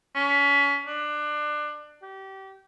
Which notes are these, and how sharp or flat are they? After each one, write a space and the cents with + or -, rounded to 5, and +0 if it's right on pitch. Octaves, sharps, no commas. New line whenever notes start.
C#4 +30
D4 +25
G4 -30